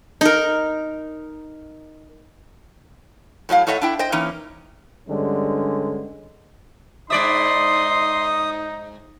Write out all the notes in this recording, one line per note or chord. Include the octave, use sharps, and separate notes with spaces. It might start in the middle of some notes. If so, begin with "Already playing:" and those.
D#4 A#4
A2 F#3 D#5 F5
A2 A4 C#5 D#5 E5 F#5
D4 E4 G5
C5 D#5 G5
E3 A#3 C#4 D#4
G2 D3 G3 G#3 C#4
G#2 D#4 D5 E5 C6 D#6